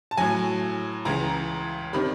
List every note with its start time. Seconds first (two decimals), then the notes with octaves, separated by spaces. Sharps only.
0.11 A5
0.17 A2 F#3 G#5
1.05 C#2 C#3 E3 A#5
1.93 C3 D#3 G3 B5